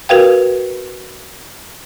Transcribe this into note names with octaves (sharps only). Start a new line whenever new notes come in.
F#4 A#4 B4 F5 G5